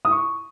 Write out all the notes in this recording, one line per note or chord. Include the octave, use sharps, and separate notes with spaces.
D#6
C#6